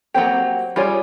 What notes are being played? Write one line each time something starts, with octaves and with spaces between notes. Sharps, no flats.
F#3 A#3 C4 G4
G3 F4 G#4 C#5